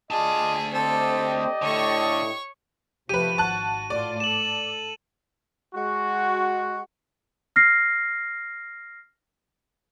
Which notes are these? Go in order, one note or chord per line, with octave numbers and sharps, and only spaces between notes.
D2 F4 G#4 D5 D#5 A5
C4 G4 A4 C5 D5 D#5
A2 D3 C#5 C#6
C3 F3 A3 G4 B4 D#7
G#1 F#4 A5 F#6
A2 F4 D5 A5
A4 E7 F#7
G#3 F#4
F6 A#6 C7